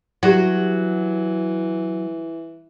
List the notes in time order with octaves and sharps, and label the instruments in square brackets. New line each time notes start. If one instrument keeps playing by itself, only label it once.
[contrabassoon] E3 [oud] F#3 [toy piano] G4 F#5